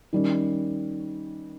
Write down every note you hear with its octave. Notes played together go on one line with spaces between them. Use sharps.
D#3 G3 C#4